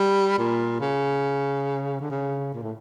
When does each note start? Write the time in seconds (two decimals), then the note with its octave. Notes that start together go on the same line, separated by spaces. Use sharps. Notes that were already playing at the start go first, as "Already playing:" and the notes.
Already playing: G3
0.39 A#2
0.81 C#3
2.01 D3
2.10 C#3
2.54 A#2
2.63 A2